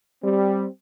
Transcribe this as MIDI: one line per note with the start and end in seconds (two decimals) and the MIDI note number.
0.23 0.66 55
0.23 0.66 60